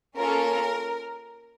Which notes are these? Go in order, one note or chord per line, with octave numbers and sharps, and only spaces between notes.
A#3 C#4 F4 A4 A#4